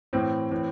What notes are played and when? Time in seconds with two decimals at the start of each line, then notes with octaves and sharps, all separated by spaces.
0.13 A2 E3 C4
0.51 A2 E3